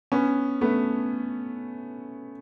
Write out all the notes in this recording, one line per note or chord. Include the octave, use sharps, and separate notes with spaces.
B3 C#4
A3 B3